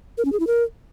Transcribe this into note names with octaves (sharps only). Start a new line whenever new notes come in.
A#4
C#4
G#4
E4
A#4